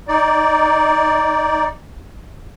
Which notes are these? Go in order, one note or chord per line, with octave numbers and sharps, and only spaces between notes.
D#4 D5